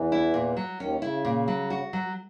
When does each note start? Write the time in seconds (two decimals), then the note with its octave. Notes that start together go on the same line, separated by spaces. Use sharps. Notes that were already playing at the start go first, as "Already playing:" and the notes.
Already playing: E2 E3
0.12 E4
0.34 A#2
0.57 F#3
0.80 D#2 D#3 C#4
1.02 C#3 E4
1.25 A#2
1.48 F#3
1.70 F#4
1.93 F#3